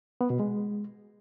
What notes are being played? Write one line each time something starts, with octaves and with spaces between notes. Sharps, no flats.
B3
B2
G#3